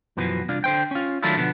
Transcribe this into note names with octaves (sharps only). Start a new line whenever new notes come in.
F#2 B2 E3 F3
C2 D4 F4
D3 C5 G5
C#4 F4
D#3 F#3 A3 D4 E4 F4
B2 D3 F3 B3